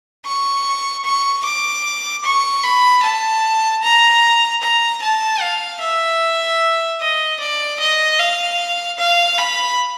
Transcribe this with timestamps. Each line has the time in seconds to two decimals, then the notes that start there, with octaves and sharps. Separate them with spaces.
0.25 C#6
1.05 C#6
1.45 D6
2.24 C#6
2.63 B5
3.03 A5
3.83 A#5
4.62 A#5
5.02 A5
5.41 F5
5.81 E5
7.00 D#5
7.40 D5
7.80 D#5
8.19 F5
8.99 F5
9.38 B5